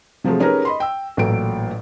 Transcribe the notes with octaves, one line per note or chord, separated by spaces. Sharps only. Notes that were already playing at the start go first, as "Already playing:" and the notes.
C3 F3 F#3 G#3 A3
C#4 D#4 G4 G#4 A#4 B4
D#5 B5 C6
G5 E6
A1 A#2 F#3 A4 G5 D7